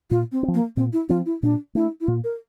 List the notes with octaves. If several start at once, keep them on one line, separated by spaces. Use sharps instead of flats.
A#2 F4
C4
C4
F3
A#3
A#2 C4
E4
F3 C4 F4
E4
A#2 D4
A3 D4 E4
E4
A#2 F4
A#4